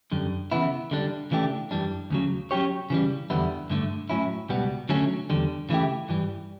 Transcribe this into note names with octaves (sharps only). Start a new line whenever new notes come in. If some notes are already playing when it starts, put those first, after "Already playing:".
F#2 D3 G3
C#3 E3 B3 E4
D3 G3 D4
C#3 E3 A3 D4 G4
F#2 E3 G3 D4
D2 C#3 F#3
F#3 C#4 G4 C#5
C#3 E3 G3
E2 D3 G3 B3 E4
G2 D3 A3
A2 F#3 C#4 E4
C#2 B2 G3 B3
D3 F#3 A3 C#4
E2 D3 G3
C#3 E3 A3 E4 G4
G2 E3 G3